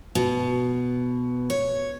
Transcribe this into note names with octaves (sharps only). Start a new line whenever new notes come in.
B2
C#5